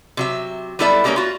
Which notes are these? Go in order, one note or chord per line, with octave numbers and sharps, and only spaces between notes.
C3 F#3 E5
G3 B3 E4 A4 D5 E5
G3 G#3 A#3 C#4 A#4 C#5
F4 F#4